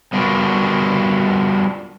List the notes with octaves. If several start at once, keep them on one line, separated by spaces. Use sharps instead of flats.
G3 B3 D4 F4 F#4 A#4